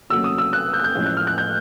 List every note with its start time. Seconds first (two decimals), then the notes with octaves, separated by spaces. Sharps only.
0.10 F1 D#2 C#3 F#3 E6
0.24 D#6
0.38 E6
0.53 F#6
0.73 G6
0.80 F#6
0.84 G6
0.95 A1 A2 F3 G#3 C#4
1.06 F#6
1.17 F6
1.27 F#6
1.38 G6